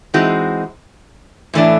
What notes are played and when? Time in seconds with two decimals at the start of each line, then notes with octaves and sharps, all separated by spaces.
0.14 E3 G#3 C4 D#4 F#4
1.54 A2 E3 A3 D4